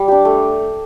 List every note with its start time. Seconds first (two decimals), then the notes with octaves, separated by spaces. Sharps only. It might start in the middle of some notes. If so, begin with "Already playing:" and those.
Already playing: G3
0.08 D4 G4
0.25 A3